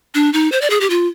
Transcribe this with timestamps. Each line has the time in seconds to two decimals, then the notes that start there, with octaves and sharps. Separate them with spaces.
0.15 D4
0.33 D#4
0.52 C5
0.61 D5
0.70 G#4
0.81 G4
0.90 F4